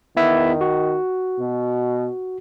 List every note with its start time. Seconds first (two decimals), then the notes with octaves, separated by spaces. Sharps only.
0.17 D#3 B3 E4 E5
0.61 F#4
1.39 B2